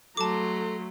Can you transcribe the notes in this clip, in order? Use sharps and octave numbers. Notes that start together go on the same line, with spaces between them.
F#3 A3 A4 A5 A#5 C6 D6